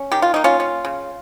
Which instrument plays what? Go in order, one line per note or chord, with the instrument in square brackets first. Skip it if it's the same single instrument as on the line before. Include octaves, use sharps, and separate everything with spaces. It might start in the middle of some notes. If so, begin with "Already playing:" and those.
Already playing: [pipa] C#4
D#3 G4
F4
A#3 D#4
C#4 F4
C#4
C#3